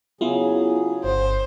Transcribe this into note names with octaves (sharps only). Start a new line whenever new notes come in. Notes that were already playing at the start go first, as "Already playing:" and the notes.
C#3 F#3 B3 E4 F4 G#4
G1 C5